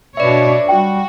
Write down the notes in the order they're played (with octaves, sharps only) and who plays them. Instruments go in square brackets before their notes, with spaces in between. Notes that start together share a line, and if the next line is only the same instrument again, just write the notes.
[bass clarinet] B2 [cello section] D4 B4 C#5 [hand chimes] D5 E5
[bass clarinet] G3 [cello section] F#4 [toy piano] G5